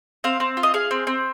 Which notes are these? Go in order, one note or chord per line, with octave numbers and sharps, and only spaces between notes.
C4 F5
C4
F4
D#5
G#4 F5
C4
C4